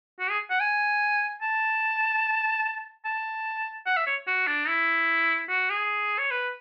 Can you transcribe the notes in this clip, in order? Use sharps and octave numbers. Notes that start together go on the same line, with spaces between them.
F#4
G#4
F#5
G#5
A5
A5
F#5
E5
C#5
F#4
D4
E4
F#4
G#4
C#5
B4